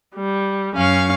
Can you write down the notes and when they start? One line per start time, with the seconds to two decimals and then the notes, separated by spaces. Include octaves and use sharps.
0.16 G3
0.74 F#2 C#4 F5 C#6